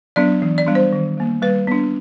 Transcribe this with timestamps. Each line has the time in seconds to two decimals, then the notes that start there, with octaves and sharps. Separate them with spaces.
0.16 F#3 B3 D4 D5
0.42 E3
0.58 D5
0.67 G3 B3 D4
0.75 C5
0.93 D#3
1.18 G3 A#3
1.42 G3 B4
1.67 B3 D4